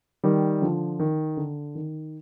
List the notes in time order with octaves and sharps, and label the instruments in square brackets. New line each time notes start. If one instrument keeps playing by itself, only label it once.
[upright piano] D#3 G3
D3 F3
D#3
D3
D#3